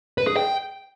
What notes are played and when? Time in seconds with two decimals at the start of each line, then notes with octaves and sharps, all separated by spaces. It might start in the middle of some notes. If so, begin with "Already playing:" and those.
0.18 B4
0.27 G#4
0.37 G5